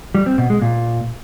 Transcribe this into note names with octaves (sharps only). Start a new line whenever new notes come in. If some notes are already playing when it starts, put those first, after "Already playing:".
G3
C4
B2
G#3
A#2